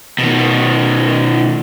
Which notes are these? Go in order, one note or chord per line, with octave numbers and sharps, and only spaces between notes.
B2 D#3